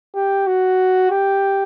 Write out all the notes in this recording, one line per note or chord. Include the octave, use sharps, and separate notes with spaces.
G4
F#4
G4